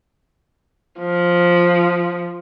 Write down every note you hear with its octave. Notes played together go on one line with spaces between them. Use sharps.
F3